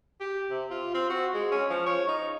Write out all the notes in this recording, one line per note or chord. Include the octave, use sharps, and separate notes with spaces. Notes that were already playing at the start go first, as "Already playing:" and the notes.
G4
C3
F4
C4
F#4
G#3
C#4
F3
C#5
D#4